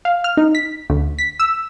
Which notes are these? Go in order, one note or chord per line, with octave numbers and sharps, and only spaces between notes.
F5
F6
D#4
B6
D2
B6
E6